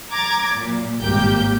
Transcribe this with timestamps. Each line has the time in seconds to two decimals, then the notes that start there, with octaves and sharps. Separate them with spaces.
0.13 A#5 D6 G#6 A6
0.55 A#2 F#3
1.01 G#1 G2 A#3 G4 G5 G6